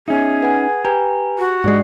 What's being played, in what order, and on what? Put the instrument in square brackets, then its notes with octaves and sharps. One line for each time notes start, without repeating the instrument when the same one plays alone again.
[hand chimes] B3 E5 [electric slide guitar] C#4 D#4 [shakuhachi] G#4
[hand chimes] B4 F#5 G#5
[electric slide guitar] G4 [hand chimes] B4 G#5 A#5
[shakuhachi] F#4
[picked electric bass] G#2 G#3 [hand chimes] D4 D5 C7